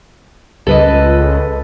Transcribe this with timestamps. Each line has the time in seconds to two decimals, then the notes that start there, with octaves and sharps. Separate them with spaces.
0.67 C#2 A4 B4 D#5